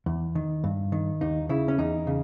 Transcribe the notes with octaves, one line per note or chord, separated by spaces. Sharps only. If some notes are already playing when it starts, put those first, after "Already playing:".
E2
D#3
G2
D#3
D#2 D#4
C#3 E4
C#4
E2 D#4
C#3